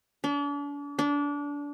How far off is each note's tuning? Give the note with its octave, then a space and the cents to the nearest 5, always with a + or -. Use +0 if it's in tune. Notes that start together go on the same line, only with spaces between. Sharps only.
D4 -40
D4 -25